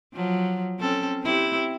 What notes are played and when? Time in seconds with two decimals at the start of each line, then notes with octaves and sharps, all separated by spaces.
0.14 F3 F#3
0.79 C4 C#4 A4
1.23 C4 E4 G4